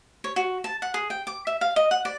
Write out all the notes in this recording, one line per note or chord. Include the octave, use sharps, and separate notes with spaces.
C#5
F#4
A5
F#5
G#4
G5
D6
E5
F5
D#5
F#5
D5